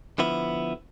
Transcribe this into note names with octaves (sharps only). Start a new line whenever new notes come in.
D3 F3 B3 E4